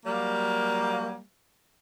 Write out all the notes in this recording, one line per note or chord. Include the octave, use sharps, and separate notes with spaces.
F#3 G3 A#3